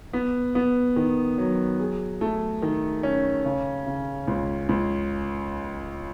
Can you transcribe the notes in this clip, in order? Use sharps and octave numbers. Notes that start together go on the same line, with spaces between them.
B3
B3
D#3
F#3
G#4
A3
D#3
C#4
C#3
C#3
C#2
C#2